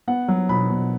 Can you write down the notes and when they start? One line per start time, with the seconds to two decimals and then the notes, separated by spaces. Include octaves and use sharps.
0.07 B3 F#5
0.28 F#3
0.49 B2 B5
0.70 B2